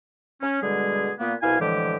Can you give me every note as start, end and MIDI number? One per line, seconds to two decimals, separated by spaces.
0.41 0.58 61
0.62 1.11 47
0.62 1.11 50
0.62 1.11 55
0.62 1.11 56
0.62 1.11 68
1.19 1.34 46
1.19 1.34 58
1.19 1.34 59
1.42 1.60 36
1.42 1.60 47
1.42 1.60 64
1.42 1.60 77
1.42 1.60 80
1.60 1.97 45
1.60 1.97 50
1.60 1.97 52
1.60 1.97 53
1.60 1.97 56
1.60 1.97 67